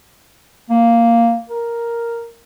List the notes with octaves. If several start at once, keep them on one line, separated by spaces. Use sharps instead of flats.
A#3
A#4